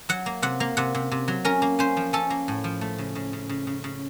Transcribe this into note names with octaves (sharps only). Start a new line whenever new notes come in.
F#3 F#5
A#3
C3 F#5
A#3
C3 F#5
C3
C3
F#3
C#4 A#4
A#3
C#4 C5
F3
C#4 A4
A#3
A2
F3
A3
C#3
C#3
C#3
C#3
C#3
C#3